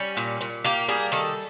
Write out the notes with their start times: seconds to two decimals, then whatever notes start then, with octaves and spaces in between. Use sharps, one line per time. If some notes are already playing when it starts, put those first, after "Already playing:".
Already playing: G3 C#4
0.17 A#2
0.41 A#2
0.64 A#3 G4
0.88 G3 G#4
1.12 D#3 A4